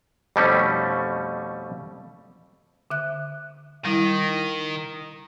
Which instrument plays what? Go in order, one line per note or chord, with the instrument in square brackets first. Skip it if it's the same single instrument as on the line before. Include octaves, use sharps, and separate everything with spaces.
[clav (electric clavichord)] F2 B2 G3 A3 C#4 D#4
[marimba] D3 E5 F#6
[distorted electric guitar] D#3 [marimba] G3 E4